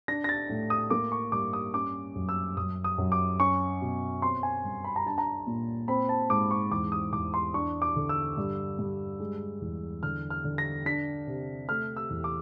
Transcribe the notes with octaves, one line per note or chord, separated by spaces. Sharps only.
D4 A#6
A#6
A6
A2
D#6
A#3 D6
C#6
G2 D6
D#6
C#4 D6
F#2
E6
F#2 D#6
D#6
F#2
D6
C#4 C#6
B2
C4 C6
G#5
G2
B5
A#5
D4 A5
A#5
A#2
C4 B5
A5
G#2 D6
C#6
E2 D6
D#6
E2 D6
C6
D4 C#6
D6
D3
E6
G2
G2
G#3
E2
D3 F6
F6
D3
A#6
D4 B6
C3
A3 F6
E6
E2
D6